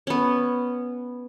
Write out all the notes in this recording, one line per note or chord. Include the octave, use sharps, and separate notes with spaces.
B3 C#4